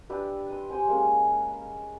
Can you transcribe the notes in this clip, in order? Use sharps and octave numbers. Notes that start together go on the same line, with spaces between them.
D4 G4 B4 E5
C6 D#6
G4 C5 G5 G#5
G#3 A#3 C#4
B5